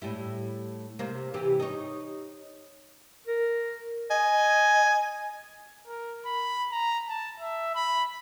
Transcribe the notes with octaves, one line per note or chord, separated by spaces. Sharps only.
A2 G3 E4
C3 A#3
C3 E3 G4
D#4 C#5
A#4
D#5 G#5
A#4
B5
A#5
A5
E5
B5